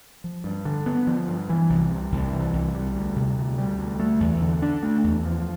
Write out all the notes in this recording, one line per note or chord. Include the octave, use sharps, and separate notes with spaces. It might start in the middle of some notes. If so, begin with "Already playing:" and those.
F3
G2
D3
B3
F3
G2
E3
C2
C3
C2
E3
C2
G3
D2
C3
D2
G3
D2
A3
E2
D3
D4
A3
E2
F3